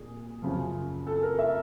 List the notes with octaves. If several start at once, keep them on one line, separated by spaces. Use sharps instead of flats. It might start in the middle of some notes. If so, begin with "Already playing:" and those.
Already playing: A#2 G#4
F#2 C#3 F3
A4
A#4
E5